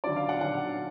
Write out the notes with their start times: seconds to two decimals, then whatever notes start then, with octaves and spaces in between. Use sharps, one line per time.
0.04 D3 F#3 C#4 D5
0.16 F5
0.29 F#5
0.41 D3 F#3 C#4 F#5